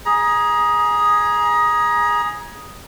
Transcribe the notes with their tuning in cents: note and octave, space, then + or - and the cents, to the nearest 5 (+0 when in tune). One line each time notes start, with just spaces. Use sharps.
G#4 +0 A#5 +30